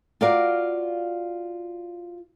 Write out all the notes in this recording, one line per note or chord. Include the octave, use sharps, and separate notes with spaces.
F4 F#4 A#4 D5 F5